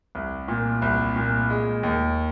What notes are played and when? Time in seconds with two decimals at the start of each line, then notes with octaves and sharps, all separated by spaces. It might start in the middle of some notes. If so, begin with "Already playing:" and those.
0.15 C2
0.48 A#2
0.82 C2
1.16 A#2
1.50 G#3
1.83 D#2